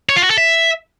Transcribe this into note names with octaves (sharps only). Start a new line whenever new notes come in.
C#5
F4
F#4
A4
E5